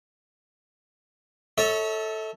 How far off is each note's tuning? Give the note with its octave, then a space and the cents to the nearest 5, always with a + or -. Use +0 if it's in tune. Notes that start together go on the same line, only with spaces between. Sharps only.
A4 +0 C#5 +0 E5 -40